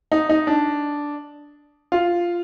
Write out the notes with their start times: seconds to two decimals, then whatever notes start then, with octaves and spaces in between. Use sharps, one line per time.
0.12 D#4
0.29 D#4
0.47 D4
1.92 F4